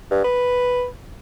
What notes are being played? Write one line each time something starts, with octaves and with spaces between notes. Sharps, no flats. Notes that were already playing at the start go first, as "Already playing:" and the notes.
G2
B4